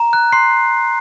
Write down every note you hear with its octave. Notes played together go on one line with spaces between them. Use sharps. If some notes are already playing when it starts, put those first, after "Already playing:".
Already playing: A#5
F#6
C6 C7